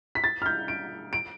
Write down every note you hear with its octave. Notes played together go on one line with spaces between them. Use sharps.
B6
A6
F6
G6
D7
D7